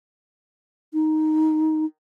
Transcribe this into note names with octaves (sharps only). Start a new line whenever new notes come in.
D#4